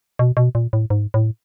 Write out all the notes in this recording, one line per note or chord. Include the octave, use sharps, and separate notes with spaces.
B2
B2
A#2
A2
G#2
A2